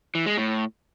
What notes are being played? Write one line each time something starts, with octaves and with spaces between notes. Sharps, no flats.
E3
G#3
A2